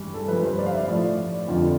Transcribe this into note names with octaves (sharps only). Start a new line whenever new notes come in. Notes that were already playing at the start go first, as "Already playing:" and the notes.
Already playing: G2 E3 G3
A4
G2 F3 B4
C5
D5
F5
E5
A2 F3 D5
F2 D3 F3 F4